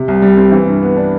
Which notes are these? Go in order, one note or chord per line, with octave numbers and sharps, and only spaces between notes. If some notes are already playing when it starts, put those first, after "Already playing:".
Already playing: C3
C2
G3
C4
E3
G2
B3
D4